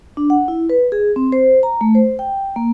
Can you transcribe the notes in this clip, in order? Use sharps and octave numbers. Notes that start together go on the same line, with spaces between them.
D4
F#5
E4
B4
G#4
C4
C5
A#5
A3
C5
G5
A#3